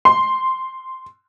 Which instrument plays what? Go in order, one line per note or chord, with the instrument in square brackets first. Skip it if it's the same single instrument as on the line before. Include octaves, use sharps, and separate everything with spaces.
[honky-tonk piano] C6